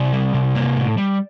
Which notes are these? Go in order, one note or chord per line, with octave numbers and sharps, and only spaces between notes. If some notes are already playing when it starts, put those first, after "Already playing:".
Already playing: C3 D5
G3
C3
A#3
A2
G3